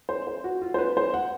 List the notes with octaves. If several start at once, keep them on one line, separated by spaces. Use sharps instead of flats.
C5
C5
F#4
F4
C5
B4
C5
F#5